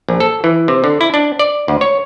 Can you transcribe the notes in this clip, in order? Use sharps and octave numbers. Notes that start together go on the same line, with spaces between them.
A#1
A4
E3
C3
D3
E4
D4
D5
D2
C#5